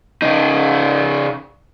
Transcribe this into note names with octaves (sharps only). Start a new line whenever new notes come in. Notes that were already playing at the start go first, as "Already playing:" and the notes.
C#3 D#4